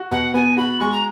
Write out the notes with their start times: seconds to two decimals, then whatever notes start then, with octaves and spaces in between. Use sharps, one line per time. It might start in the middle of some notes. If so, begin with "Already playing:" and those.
Already playing: F#4
0.11 B2 F#5
0.34 B3 G#5
0.57 F#4 B5
0.80 G#3 C#6
0.92 A#5